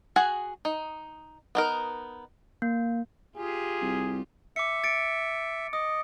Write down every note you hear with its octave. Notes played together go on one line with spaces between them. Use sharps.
F#4 G#4 F#5 G#5
D#4
B3 D#4 A#4
A#3
F4 G4 G#4
C2
E5 D6 C#7
A6 C#7 D7
D#5 D#6